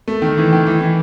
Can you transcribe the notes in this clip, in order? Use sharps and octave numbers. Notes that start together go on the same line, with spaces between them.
A3
D#3
E3
D#3
E3
E3